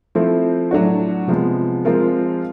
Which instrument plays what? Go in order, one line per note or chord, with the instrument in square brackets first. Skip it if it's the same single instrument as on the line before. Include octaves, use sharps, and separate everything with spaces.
[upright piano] F3 A3 C4 E4
A2 F#3 A3 D4 F#4
C3 F3 G#3 B3
F3 G#3 C4 F4 A#4